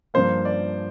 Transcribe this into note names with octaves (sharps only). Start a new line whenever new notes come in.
G2 F3 A#3 C5
D5